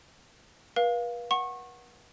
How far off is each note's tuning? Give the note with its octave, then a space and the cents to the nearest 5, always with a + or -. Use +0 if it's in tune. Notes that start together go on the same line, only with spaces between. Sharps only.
B4 -40 F5 +0
F#5 +0 C#6 -30